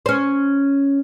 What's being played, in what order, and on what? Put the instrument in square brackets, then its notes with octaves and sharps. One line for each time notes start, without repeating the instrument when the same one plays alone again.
[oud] C#4 C5